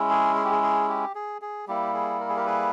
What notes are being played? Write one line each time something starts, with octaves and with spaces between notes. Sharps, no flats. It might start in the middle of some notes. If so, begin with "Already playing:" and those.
Already playing: G#3 C#4 E4
G#4
G#4
G4
G#4
G#4
G4
G#4
G#4
G3 A#3 E4 G4
G#4
A#4
G#4
G4 A#4
G#4 B4